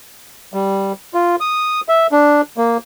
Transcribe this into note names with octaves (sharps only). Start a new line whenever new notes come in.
G3
F4
D#6
E5
D4
A#3